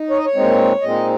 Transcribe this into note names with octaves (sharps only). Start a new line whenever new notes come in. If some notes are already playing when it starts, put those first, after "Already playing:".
Already playing: D#4
C#5
D#5
C#5
A#2 G#3 C4 D#4
A#2 G#3 C4 D#4 D#5